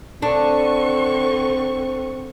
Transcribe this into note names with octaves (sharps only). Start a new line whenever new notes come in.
D3 C4 D4 C#6